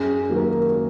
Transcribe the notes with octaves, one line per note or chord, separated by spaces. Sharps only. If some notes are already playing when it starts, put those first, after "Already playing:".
Already playing: F#2 G#4
D#3 F#3 A#3
A#4